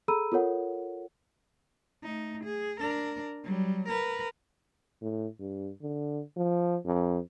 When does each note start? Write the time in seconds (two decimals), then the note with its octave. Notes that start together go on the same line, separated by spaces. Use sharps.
0.08 G#4 A4 A#5 B5 E6 D#7
0.32 F4 A4 A#4 C#5 F#5
2.04 A3 D#4
2.44 G#4
2.79 D4 A#4
3.44 F#3 G3
3.89 A#4 B4
5.02 A2
5.40 G2
5.82 D3
6.36 F3
6.85 F2